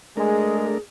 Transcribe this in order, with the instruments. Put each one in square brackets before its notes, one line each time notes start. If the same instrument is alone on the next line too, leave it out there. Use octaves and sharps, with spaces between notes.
[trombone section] G#3 [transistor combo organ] A3 D4 A#4 [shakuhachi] G#4